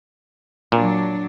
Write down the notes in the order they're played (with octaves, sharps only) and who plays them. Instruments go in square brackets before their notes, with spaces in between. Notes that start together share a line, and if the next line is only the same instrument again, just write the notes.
[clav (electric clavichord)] A#2 [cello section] F#3 D4